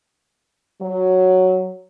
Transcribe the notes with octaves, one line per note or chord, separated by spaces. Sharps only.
F#3